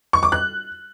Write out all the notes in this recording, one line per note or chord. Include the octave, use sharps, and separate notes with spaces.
C#6
D6
F#6